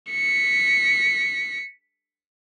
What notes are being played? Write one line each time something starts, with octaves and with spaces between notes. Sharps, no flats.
B6 C#7